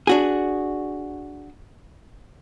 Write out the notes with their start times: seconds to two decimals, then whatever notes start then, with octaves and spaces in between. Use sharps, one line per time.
0.07 D4 F#4 G#4